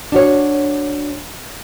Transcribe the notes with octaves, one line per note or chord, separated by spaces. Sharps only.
D4 F#4 C#5